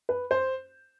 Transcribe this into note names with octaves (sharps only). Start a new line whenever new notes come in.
B4
C5